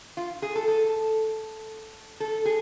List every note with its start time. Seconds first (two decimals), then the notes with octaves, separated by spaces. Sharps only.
0.17 F4
0.42 G#4
0.55 A4
0.68 A4
2.20 A4
2.45 G#4